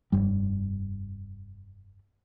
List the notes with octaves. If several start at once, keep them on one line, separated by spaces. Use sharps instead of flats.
F1 G2 G3